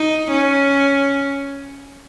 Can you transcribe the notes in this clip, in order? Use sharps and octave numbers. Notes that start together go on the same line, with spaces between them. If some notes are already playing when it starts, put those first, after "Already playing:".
Already playing: D#4
C#4